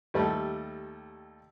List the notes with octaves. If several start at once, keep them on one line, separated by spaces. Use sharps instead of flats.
D#2 G3 A3